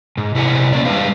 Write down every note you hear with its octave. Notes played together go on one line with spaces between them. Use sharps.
G#2
C3 E4 D5 F#5 G#5
A#3 C#4 D5
G3 G#3 D4 B4 E5 F5